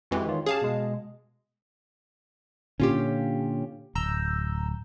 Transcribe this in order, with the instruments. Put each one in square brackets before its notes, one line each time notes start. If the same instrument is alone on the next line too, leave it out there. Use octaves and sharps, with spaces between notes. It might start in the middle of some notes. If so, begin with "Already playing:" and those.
[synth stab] F2 E3 G#3 [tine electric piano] F#4 G4
[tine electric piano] D#3 F4 C#5
[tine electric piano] C#4 G4 [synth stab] G#4 F5 A5
[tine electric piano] B2 G#3
[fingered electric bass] A#2 D3 [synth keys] C#4 F4 G4
[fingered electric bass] D1 [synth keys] A#5 E6 G6